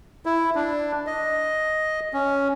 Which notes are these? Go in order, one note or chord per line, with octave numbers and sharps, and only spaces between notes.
E4
D4
D#5
C#4